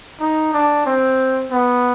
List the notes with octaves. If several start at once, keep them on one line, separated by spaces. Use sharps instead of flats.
D#4
D4
C4
B3